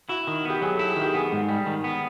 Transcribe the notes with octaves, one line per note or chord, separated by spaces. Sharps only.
E4 F#4
D#3
B3 G4
F#3 G#4
A4
E4
G#4
D#3
G4
B3 G#4
G#2
G3
D#3
B3